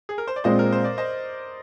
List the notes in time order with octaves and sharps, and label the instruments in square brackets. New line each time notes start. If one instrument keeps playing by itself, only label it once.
[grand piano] G#4
A#4
C5
D5
[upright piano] A#2 G#3 C4 [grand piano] C5 D#5
[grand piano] A#4
C5
D5
C5 D#5